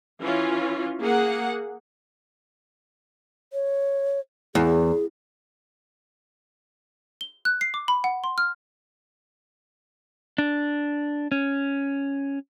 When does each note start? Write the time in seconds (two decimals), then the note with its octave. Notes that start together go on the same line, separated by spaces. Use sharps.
0.21 E3 C#4 F4
1.00 A#3 G#4 F#5
3.53 C#5
4.55 E2 G#4
7.21 G7
7.45 F#6
7.61 C7
7.74 D6
7.88 B5
8.04 F#5
8.24 C6
8.38 F6
10.38 D4
11.32 C#4